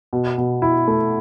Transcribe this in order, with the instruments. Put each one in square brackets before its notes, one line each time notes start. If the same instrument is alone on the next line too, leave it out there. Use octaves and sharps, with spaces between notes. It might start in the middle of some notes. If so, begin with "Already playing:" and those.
[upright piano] B2
B2
E4
A3